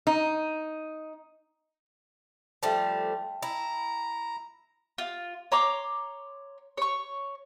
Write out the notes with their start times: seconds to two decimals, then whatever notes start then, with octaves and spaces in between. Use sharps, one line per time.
0.07 D#4
2.63 F3 G3 A3 E5 G5 A5
3.43 E4 A#5
4.98 F4
5.52 C#5 A#5 C6 D6
6.78 C#5 C#6